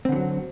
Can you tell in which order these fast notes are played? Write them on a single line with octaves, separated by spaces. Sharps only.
C4 D3 E3 F#3